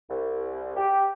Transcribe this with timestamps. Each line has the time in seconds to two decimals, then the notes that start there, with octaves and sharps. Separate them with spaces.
0.09 C2
0.76 G4